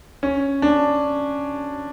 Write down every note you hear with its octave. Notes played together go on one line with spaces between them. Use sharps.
C#4
D4